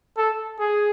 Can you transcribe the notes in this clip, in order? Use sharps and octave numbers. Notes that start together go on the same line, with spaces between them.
A4
G#4